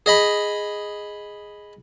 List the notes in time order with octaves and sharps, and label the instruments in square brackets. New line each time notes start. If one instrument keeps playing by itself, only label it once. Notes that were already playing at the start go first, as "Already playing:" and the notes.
[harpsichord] G#4 D#5 B5